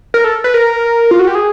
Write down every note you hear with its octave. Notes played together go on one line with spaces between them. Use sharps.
A#4
A4
B4
A#4
F4
F#4
G4
G#4